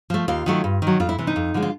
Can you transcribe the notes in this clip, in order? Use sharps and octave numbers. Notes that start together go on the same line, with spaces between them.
F3 A3
D#2 F4
D#3 F#3 A3
G2
D#3 F#3
F2 F4
E4
C3 E3
D#4
F2
D3 F3 G#3
F4